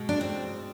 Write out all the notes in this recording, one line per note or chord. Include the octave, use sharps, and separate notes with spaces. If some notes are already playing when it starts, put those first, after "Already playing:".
Already playing: B2 G#3
D4
C4